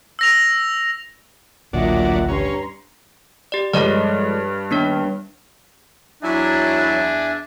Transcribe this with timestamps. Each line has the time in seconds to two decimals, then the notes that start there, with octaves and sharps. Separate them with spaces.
0.19 E6 A#6 F7
1.73 A1 D2 A#2 F#3 D4 D#5 E5 F#5
2.28 G2 C#4 A#5 C6
3.52 G4 D5
3.73 G2 F3 G#3 A4 C#5 D5
4.71 D#2 B3 D4 C#5
6.23 E2 F#3 D4 E4 E5 G#5